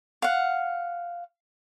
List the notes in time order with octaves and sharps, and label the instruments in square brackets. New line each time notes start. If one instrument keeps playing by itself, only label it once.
[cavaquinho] F5 F#5